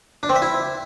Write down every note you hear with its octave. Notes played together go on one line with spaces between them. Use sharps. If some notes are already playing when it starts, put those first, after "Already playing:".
D4
C4
E5
E4